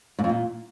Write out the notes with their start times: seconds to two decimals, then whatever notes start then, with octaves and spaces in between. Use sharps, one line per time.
0.19 G#2
0.24 F2
0.29 A#2